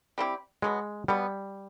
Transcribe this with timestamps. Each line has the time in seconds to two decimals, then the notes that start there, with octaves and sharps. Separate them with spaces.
0.18 G3 C4 E4 G4
0.62 B2 F#3 G#3 B3
1.08 B2 F#3 G3 B3